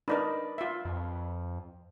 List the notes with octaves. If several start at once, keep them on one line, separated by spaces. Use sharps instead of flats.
D4 D#4 A#4 B4 D5
F4 E5
F2